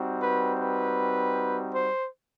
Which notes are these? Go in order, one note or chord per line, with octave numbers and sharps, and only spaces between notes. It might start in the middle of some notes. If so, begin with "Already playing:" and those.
Already playing: G3 C4 D#4 F#4
B4
B4
C5